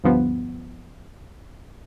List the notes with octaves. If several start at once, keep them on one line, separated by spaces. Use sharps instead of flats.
D2 G2 F3 B3